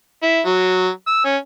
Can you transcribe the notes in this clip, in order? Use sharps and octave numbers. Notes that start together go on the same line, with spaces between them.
E4
F#3
E6
C#4